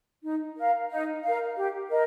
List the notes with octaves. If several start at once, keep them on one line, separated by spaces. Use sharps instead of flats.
D#4
A#4 F5
D#4
A#4 F5
G4
A#4 D#5